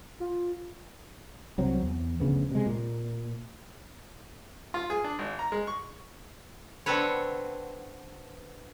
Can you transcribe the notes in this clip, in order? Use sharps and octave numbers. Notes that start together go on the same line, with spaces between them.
F4
C2 F#3 C4
E2
F1 D2 C#3 B3
C3 G#3
A#2
F4
G#4
D4
G#1
A#5
G#3
C#6
D3 B3 C4 A4 B4 C#5